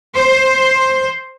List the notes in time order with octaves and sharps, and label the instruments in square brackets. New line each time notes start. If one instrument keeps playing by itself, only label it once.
[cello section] C5